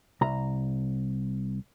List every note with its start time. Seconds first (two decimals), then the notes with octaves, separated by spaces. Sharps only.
0.21 C2 A#5